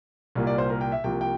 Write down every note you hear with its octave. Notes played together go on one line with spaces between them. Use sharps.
C2 A#2 G3 A#3
D5
C5
A#4
G5
E5
C2 C3 F3 A#3 G5
G5